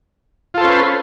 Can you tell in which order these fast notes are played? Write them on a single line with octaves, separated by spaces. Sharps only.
F4 A4 C5 C#4 B4